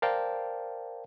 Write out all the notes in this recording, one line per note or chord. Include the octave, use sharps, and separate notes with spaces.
A#4 C5 D5 F5 G5 A5